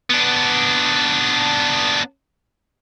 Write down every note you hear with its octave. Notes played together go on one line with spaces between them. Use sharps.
B3 D4